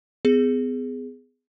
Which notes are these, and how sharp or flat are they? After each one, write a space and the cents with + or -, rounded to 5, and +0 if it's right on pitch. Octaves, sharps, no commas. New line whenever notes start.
B3 +35 G#4 +0